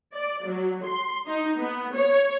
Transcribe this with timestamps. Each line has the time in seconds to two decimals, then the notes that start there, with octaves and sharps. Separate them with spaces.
0.14 D5
0.46 F#3
0.84 C6
1.27 D#4
1.59 B3
1.95 C#5